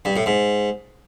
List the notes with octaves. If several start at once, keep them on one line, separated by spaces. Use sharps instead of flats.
G2
A2
G#2